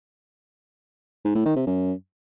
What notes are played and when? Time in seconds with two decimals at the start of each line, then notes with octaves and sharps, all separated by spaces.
1.25 G#2
1.35 A2
1.45 D#3
1.56 C3
1.66 F#2